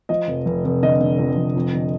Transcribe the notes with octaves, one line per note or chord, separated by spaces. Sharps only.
F3 D#5
F1
F1
F1
D3 D#5
D3
F2
F1
F2
D3